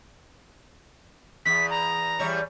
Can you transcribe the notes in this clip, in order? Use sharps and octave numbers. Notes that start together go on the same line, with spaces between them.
E2 B3 B6
A#5
E2 G3 C#5